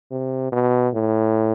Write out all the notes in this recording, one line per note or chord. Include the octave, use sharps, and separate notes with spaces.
C3
B2
A2